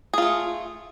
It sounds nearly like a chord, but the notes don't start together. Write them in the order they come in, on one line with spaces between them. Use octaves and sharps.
G#4 F4 A3